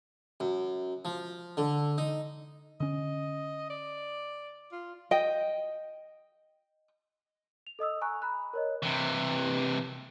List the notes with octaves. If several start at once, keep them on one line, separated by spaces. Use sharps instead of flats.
F#2
F3
D3
D#4
D3 C#4 D#5
D5
F4
D#5 G5
F7
A4 D#5 D#6 E6
G#5 A#5 C#6 F#6
A#5 B5 F#6
A#4 C#5 D#5
C3 E3